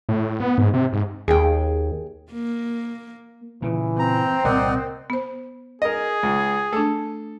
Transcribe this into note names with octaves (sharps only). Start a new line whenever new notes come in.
A2
B3
G#2
C3
G#2
D#2 G#4 G5
A#3
A#2 C#3 E3
C4 A#5
C2 A#2 A#4 D5 D#5 F#5
B3 C5
G#4 A#4 D#5
C#2
A3 D4 A4